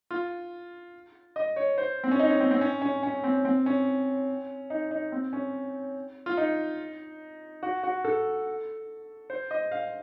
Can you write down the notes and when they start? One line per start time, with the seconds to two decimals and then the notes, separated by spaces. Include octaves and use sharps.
0.11 F4
1.36 D#5
1.56 C#5
1.78 C5
2.04 C4
2.11 C#4
2.20 D#4
2.30 C#4
2.40 C4
2.51 C4
2.61 C#4
2.82 C#4
3.03 C#4
3.24 C4
3.45 C4
3.66 C#4
4.70 D#4
4.91 D#4
5.12 C4
5.33 C#4
6.26 F4
6.37 D#4
7.63 F#4
7.83 F#4
8.05 A4
9.30 C5
9.51 D#5
9.71 F5